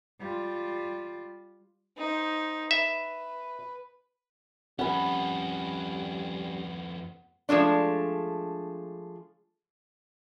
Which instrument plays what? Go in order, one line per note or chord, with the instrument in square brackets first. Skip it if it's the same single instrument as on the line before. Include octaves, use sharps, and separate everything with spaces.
[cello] G3 F4
[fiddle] D#4 C5
[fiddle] B4 [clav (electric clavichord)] E5
[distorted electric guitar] F2 B3 [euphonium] G3 [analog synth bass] C#4 [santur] F#5 B5
[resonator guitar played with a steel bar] F3 G#3 A3 D4